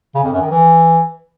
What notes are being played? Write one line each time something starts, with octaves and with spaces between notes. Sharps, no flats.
C#3
F2
F#2
D#3
E3